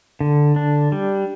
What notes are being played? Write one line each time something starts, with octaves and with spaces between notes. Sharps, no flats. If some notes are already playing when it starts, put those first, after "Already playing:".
D3
D4
G3